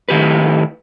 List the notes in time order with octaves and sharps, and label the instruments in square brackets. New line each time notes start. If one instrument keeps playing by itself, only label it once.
[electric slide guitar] A2 D#3 G4 B4